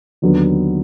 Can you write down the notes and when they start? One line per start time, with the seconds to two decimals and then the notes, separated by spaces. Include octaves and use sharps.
0.22 D#2 D3 F#3 B3